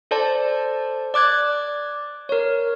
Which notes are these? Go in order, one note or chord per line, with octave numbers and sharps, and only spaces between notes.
A4 C5 D5 A5
D5 D6 F#6 G#6
A#4 C#5